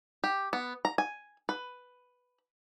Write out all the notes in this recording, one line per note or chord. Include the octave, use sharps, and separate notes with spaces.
G4
B3
A#5
G#5
B4